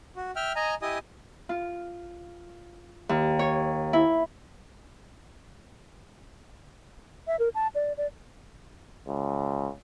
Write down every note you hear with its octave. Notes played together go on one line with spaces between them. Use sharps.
F#4
E5 G5 F6
D#5 G#5 A#5
E4 G4 D#5 G#5 D#6
F4
D#2
C#5
E4
E5
A#4
A5
D5
D5
C#2